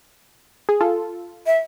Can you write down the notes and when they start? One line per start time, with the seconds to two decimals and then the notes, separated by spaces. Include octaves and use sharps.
0.69 G#4
0.81 F4 A4
1.46 E5